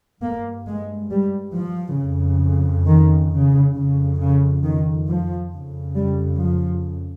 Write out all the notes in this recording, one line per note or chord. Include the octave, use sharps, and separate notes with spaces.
G2 A#3
G#3
G3
F3
F2 C#3
D#3
C#3
F2 C#3
C#3
D#3
F3
F2 C#3
G3
F3